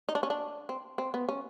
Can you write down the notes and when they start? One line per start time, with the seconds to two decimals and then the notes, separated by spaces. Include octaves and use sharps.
0.09 D#4
0.15 D4
0.23 C#4
0.30 D4
0.69 C4
0.98 C4
1.14 B3
1.29 C#4